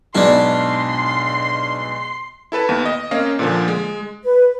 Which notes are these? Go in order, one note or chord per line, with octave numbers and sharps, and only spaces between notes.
B1 G#2 B2 D4 E4 C6
E4 A4 B4 A5
D#2 B3
D#5
A#3 C4 C#4 D#5 F5
A#2 D3 F3
G#3
B4